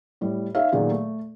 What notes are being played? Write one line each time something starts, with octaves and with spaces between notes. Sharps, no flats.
A2 G3
D#4 A4 C#5 E5 F5
A#2 D#3 F#3 B3 G#4
A3